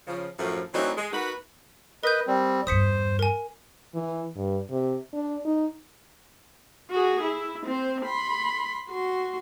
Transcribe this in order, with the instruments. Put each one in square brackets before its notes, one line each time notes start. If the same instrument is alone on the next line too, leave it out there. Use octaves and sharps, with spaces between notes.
[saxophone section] C#3 F3
F#2 A2 F3
E3 F#3 A3 C4 D4 D#4
G#3
B3 D#4 F#4 A#4 B4
[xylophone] A#4 G6 [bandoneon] B4 D#5
[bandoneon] G3 C4
[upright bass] E2 G2 [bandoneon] C5 [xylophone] D#6 B6 C#7
[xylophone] A#4 G#5
[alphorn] E3
G2
C3
D4
D#4
[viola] F#4 G#4
E4
C4 C5
B5 C6
F#4 C6